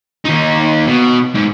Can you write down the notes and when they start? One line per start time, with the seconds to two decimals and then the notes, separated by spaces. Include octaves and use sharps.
0.25 D#2 D#4
0.87 B2
1.35 G#2